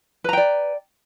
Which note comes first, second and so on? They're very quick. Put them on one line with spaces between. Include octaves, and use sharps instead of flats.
B4 A#5 G5 D5